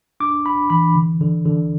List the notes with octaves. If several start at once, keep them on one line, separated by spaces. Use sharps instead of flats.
D4 D6
D4 B5
E3 B5
D3
D3
D3